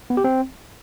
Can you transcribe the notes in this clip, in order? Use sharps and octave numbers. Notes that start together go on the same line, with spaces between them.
B3
G4
C4